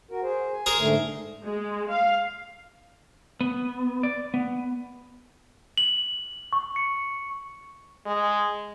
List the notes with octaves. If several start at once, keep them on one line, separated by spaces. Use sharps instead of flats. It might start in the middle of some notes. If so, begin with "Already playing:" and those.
F#4 A#4
G#4 C5
G#5
G#4 A#4 C5
G#2 D3 A3
G#3
F5
B3
D5
B3
F#7
C#6
C#7
G#3